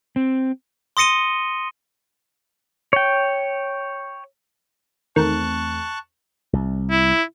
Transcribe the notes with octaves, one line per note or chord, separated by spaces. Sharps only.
C4
C6 D#6 A#6 C#7 D#7 G7
C#5 G5
E2 D#3 A3 C4 A5 C#6 F#6
C2
E4